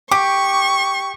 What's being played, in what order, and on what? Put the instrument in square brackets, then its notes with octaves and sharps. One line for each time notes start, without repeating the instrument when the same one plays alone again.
[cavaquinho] G4 [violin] C#6 [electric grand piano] D6